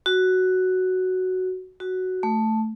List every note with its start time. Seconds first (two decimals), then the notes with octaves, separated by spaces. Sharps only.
0.06 F#4
1.80 F#4
2.23 A3